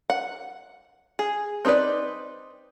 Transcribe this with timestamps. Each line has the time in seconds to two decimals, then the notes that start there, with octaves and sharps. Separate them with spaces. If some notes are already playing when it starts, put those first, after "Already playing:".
0.10 F#5
1.19 G#4
1.65 C4 D#4 A4 B4 D5